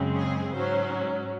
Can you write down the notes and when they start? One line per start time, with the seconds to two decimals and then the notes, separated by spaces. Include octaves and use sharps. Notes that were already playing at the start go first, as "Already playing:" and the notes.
Already playing: F#2 C#3 G#3 C4
0.16 G#4
0.55 G#2 F#3 C#4 C5